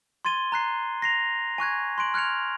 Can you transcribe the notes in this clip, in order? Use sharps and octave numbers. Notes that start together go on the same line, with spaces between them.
C6 G#6 A6 D#7 G7
A#5 F#6 C7
A#6 C7 F7
G#5 C#6 F#6 G#6
C6 F#6 D7 F#7
F6 F#6 G#6 C#7 F7